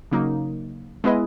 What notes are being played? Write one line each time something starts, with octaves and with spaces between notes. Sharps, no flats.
C#3 F#3 A#3 D#4
G#3 B3 E4 B4 D#5